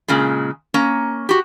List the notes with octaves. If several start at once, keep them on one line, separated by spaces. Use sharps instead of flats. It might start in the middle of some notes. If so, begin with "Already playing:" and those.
A#2 C#3 G#3
A#3 C#4 A#5
F#4 G4